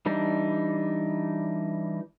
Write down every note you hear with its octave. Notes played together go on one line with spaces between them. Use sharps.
E3 G3 D4 D#4